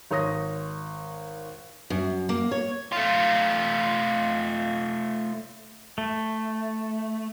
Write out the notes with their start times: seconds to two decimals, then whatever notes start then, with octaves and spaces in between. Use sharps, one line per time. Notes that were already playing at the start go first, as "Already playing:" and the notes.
0.11 G#1 C#5 D#6 A#6
1.90 F#2
2.29 A#3
2.51 C#5
2.93 A3 F4
5.98 A3